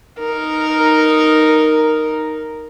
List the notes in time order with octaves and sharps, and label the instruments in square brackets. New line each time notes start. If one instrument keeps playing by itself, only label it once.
[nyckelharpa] D#4 A#4